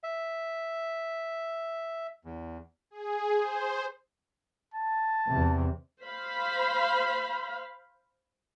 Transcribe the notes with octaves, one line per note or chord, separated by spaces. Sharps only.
E5
E2
G#4
C5
A5
E2 C3
C5 F5 B5